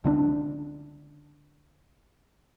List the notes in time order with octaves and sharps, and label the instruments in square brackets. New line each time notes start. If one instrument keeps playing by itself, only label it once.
[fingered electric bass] C#2 D3 C4 D4